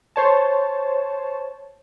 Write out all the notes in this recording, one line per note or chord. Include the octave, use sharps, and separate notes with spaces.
C5 C#5 A5